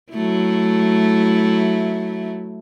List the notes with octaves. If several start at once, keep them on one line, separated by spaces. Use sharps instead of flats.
F#3 A3 E4